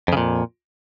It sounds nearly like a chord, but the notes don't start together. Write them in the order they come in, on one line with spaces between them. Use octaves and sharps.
F2 C#3 A#2